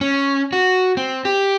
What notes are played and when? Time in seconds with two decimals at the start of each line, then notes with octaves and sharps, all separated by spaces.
0.01 C#4
0.53 F#4
0.97 C4
1.25 G4